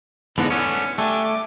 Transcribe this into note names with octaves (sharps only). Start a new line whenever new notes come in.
E2 G#2 D3 B3 D#4 B4
A3 B3 C#4 D4
A3 D4 G4 G#5
D6